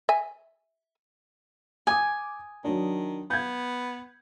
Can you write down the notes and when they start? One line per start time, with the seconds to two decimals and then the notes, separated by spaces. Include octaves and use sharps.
0.09 E5 G#5
1.87 G#5 D6 D#6
2.64 D#3 F#3 D4
3.30 B3 G6 G#6